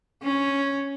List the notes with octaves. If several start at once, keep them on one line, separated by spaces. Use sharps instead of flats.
C#4